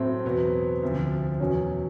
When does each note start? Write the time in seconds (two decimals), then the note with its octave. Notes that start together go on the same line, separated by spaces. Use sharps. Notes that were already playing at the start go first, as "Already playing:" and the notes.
Already playing: A2 F#3 A3 C4
0.24 E2 B2 F#3 B3
0.83 D2 C3 F3
1.40 E2 B2 F#3 C#4